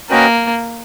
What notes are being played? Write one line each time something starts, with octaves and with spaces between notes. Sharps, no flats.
A#3 C#4 F#4 B4 D#5 G5